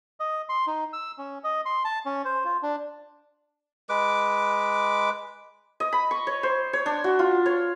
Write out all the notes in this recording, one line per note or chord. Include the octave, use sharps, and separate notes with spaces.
D#5
C6
D#4
E6
C#4
D#5
C6
A5
C#4
C5
F4
D4
G#3 B4 D6
D#5
B5
C#6
C#5
C5
C#5
D4
F#4
F4
C#5